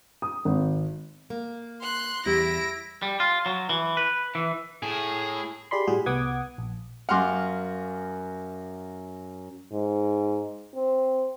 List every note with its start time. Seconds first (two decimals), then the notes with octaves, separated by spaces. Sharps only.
0.22 D#6
0.45 G#1
1.30 A#3
1.81 C6 F#6
2.26 E2 G3 E4 A#6 D7
3.02 G3
3.20 F4
3.46 F#3
3.69 E3
3.97 B4
4.35 E3
4.83 A2 G#4
5.71 G4 G#4 D5 B5 C6
5.87 A2 G3 F#4 G#4
6.06 C2 B3 F#5 D6 D#6 G#6
6.58 A#1
7.09 F#2 F5 F#5 C6 D6
9.72 G#2
10.75 C4